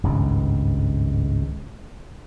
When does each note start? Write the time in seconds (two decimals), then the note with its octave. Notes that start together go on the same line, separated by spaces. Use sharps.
0.03 G#1 C#2 G2